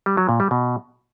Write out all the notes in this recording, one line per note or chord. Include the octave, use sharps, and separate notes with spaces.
G3
F#3
A#2
G3
B2